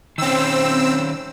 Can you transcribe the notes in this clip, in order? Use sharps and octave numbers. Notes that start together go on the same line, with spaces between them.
D#3 C4 C#4 E6